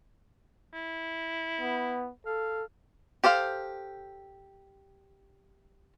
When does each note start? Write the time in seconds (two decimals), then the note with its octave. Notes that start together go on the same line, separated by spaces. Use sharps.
0.73 E4
1.60 B3
2.26 A4 F5
3.24 G4 A4 C5 F5